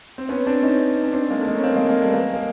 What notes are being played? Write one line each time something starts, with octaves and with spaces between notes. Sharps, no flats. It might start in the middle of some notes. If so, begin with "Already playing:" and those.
C4
B3 C#4
C4 D4
C#4 D#4
C#4
C4 D4
G#3 A#3
A3
G#3 A#3
C#4
A#3 C4
G#3 A#3
G#3 A#3
G3 A3
B3
G#3 A#3
A#3